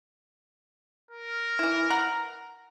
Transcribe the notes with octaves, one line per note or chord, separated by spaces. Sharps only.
A#4
E3 E4
F#5 A#5